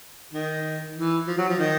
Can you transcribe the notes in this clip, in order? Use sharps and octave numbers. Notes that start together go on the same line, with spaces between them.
D#3
E3
F3
F#3
F3
D#3